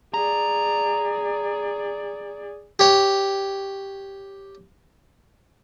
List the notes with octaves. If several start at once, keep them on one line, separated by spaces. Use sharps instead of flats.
G#4 D5 A#5
G4 C#5